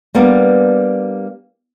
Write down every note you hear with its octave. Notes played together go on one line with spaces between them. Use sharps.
G3 A#3 B3 D4